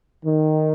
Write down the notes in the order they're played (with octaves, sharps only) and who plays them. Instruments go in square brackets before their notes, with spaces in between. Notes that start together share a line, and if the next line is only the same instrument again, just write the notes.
[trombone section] D#3